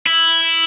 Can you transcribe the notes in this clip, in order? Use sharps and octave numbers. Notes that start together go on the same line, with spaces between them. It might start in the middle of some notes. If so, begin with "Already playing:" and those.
E4